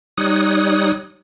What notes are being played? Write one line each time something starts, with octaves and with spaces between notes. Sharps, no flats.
G3 D#4 C#5 D#6 F#6